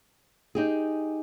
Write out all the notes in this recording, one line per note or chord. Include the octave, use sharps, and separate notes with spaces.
D#4 G4 G#4